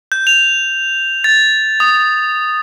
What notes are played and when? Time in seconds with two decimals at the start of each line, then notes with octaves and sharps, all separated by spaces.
0.12 G6
0.27 F7
1.24 A6
1.80 D#6